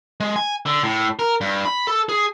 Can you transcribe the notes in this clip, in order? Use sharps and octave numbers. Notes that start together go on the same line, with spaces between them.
G#3
G#5
D3
A2
A#4
G2
B5
A4
G#4